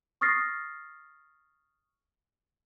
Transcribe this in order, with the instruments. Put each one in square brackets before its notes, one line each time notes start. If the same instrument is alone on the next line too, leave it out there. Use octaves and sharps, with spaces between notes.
[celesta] C#6 D#6 F6 A6 A#6 C7